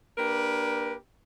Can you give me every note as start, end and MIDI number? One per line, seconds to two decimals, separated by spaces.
0.18 0.95 58
0.18 0.95 62
0.18 0.95 67
0.18 0.95 70
0.18 0.95 71